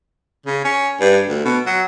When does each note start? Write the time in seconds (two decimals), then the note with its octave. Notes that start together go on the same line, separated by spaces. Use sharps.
0.46 C#3
0.65 C#4
1.00 G2
1.29 D2
1.45 B2
1.66 F#3